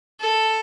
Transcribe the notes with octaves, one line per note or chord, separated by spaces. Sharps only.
A4